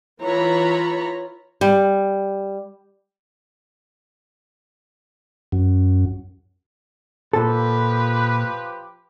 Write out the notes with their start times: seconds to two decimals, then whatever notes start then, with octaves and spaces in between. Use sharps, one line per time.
0.22 E3 F4 C#5 A#5 B5
1.61 G3
5.52 F#2
7.33 A#2 F3 G4 A4 B4